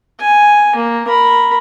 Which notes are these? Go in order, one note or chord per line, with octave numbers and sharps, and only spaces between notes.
G#5
A#3
A#4 B5